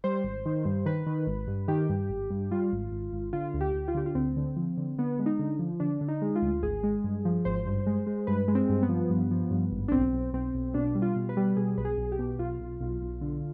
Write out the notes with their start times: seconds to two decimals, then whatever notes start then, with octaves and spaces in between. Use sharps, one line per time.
0.04 G3 C5
0.24 G#1
0.46 D#3
0.65 G2
0.86 D#3 B4
1.06 D#3
1.27 G#1
1.47 G2
1.68 D#3 G4
1.89 G2
2.09 G#1
2.30 G2
2.51 G3 F4
2.72 G#1
2.91 G#1
3.12 G#1
3.33 D3 F4
3.54 D2
3.61 G4
3.75 D2
3.88 F4
3.95 D3 G4
4.06 F4
4.15 D2 C4
4.36 D3
4.56 F3
4.77 D3
4.98 D3 B3
5.19 G#3
5.26 D#4
5.39 D3
5.59 F3
5.80 D3 D4
6.01 D3
6.08 D#4
6.22 G#3
6.35 F4
6.42 D2
6.63 G#1 G#4
6.83 G#3
7.04 G2
7.25 F3
7.45 G#1 C5
7.66 G2
7.86 G#3
8.07 G#3
8.27 G2 B4
8.48 G#3
8.55 C4
8.69 G2
8.82 B3
8.89 F3
9.10 G2
9.31 F3
9.51 G2
9.71 G#1
9.88 D4
9.92 B1 C4
10.13 B1
10.33 B1 C4
10.55 B1
10.74 B2 D4
10.95 G3
11.02 F4
11.16 B2
11.29 B4
11.37 G3
11.57 B2 G#4
11.78 B1 B4
11.85 G#4
11.98 B1
12.12 G4
12.19 B2
12.39 B1 F4
12.60 B1
12.81 B1
13.01 B1
13.21 D3